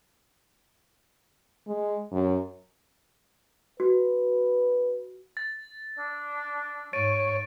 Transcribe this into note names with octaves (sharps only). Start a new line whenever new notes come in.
G#3
F#2
F#4 B4
A6
D4 E6
G#2 C#5 A6 D7 D#7